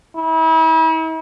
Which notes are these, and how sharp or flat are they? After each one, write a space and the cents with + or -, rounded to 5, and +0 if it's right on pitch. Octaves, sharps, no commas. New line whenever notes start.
E4 -40